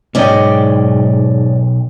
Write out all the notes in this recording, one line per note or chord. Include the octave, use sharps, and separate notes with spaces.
B1 G#2 C#4 D5 D#5 G5